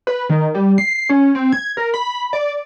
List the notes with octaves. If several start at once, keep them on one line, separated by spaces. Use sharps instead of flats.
B4
D#3
G3
C7
C#4
C4
G#6
A#4
B5
D5